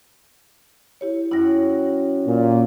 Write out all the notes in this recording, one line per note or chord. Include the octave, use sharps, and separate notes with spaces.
E4 G4 C#5
F#2 E4 G5 A#6
A#2